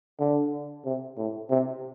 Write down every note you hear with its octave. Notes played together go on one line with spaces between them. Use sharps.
D3
C3
A2
C3